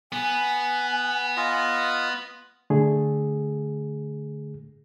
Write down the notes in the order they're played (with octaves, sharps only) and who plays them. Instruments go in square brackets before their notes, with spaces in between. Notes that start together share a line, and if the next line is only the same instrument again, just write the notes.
[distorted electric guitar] B3 [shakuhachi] G#5
[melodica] F4 D#5
[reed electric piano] D3 A3 G#4